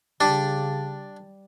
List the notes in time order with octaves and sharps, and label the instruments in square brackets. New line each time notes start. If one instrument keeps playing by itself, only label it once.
[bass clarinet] C#3 [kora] G3 [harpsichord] D4